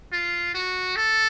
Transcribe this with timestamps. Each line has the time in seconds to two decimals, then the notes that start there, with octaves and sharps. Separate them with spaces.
0.12 F4
0.54 F#4
0.96 A4